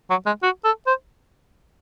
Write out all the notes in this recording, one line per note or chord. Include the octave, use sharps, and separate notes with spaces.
F#3
G#3
F#4
A4
C5